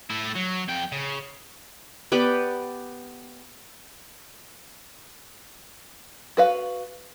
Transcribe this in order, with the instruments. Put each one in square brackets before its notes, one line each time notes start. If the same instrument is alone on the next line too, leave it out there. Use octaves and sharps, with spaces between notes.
[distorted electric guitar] A3 E4
F#3
F2 G5
C#3
[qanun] B3 G4 B4 D5
[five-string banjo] F#4 B4 F5